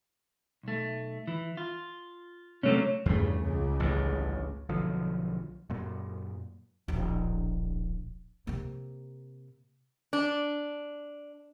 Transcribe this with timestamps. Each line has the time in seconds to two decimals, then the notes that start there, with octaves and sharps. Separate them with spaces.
0.63 B1 A3
1.27 E3
1.57 F4
2.63 C3 F#3 A3 A#3 C#4
3.06 E2 G2 C#3 A3
3.42 C#2 C#3
3.80 A1 D2 G2
4.69 B1 D3 F3 F#3
5.70 F#2 A#2
6.88 D1 A#1
8.47 C3 A#3
10.13 D4